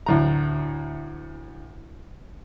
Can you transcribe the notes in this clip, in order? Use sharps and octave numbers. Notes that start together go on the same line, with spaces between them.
D2 A2 A#5